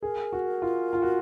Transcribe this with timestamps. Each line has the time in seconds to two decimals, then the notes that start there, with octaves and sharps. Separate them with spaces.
0.02 G#4 A#4
0.33 F#4
0.62 F4
0.93 F4
1.02 F#4